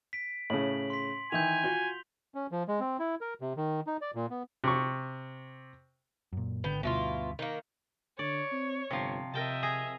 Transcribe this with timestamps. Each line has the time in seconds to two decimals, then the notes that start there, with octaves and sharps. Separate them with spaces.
0.13 B6 D7
0.50 A2 C#3 F#7
0.90 C6 B6
1.32 D#3 E3 G#5 G6 F7
1.64 F4 F#4 G7
2.35 C#4
2.52 F3
2.68 G#3
2.80 C4
2.99 E4
3.21 A#4
3.41 C3
3.57 D#3
3.87 D#4
4.01 D5
4.15 A#2
4.30 B3
4.64 C3 C#6
6.33 F#2 A#2
6.64 G#1 D3 B3 G5
6.83 D2 G2 B2 E4 F4
7.39 D#3 A#3
8.19 D3 C#5 D5
8.52 C4
8.91 G1 C3 F3
9.34 C3 A#4 D#5 E5 G5 A5
9.63 G#4 A#5